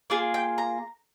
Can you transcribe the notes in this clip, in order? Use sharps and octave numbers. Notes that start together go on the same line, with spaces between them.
A#3 F4 G#4 G#5
G5
A#5